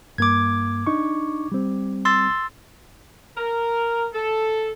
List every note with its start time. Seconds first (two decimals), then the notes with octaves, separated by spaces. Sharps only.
0.18 G2 A#3 D6 G#6
0.87 D4 D#4 C#6
1.52 G3 C4
2.05 C6 E6 A6
3.37 A#4
4.13 A4